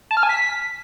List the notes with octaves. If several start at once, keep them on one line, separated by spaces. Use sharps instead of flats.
A5
F6
G#5
B6